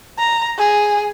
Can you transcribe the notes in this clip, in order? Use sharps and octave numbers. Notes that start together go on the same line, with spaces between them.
A#5
G#4